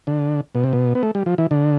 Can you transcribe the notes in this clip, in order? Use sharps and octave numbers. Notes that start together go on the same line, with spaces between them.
D3
B2
C3
B2
B3
A3
G3
F3
E3
D3